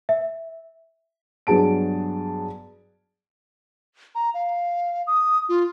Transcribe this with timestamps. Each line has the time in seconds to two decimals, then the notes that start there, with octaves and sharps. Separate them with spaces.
0.09 E5
1.47 G2 F#3 B3 G#4 A5 D7
4.15 A#5
4.34 F5
5.07 D#6
5.49 F4